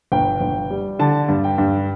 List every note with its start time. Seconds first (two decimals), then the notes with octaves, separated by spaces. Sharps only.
0.12 G1 G5
0.41 G1
0.70 G3
0.99 D3 A5
1.28 G2
1.44 G5
1.58 G2